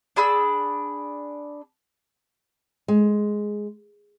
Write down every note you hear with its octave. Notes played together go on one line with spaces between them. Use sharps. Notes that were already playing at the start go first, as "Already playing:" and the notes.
D4 G#4 B5 E6
G#3